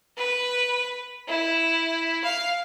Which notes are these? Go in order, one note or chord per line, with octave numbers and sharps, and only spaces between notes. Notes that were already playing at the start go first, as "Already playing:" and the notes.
B4
E4
F5